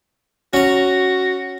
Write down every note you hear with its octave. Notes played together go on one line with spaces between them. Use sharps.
C#4 F#4 A#5